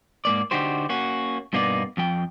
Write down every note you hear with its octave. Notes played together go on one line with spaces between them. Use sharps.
G#2 A#3 D5
D3 D4 D#4 F#4 G4 C5
A#3 C#4 F#4
G2 B2 A#3 B3 D#4 D5
F2 F3 G5